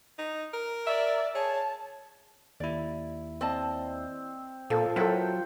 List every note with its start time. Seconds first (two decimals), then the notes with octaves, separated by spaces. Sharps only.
0.18 D#4
0.53 A#4
0.87 D5 E5
1.35 G#4 C#5 A5
2.60 D#2 E4 D5
3.41 C4 D5 D#5 A5
4.70 A#2 F3 A4
4.96 F#3 E4 A4 A#4 C5 F#5 G5